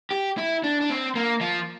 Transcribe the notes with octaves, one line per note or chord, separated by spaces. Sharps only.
G4
E4
D4
D4
C4
A#3
F3